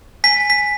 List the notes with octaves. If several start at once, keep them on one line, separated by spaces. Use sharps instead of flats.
G#5 B6
B6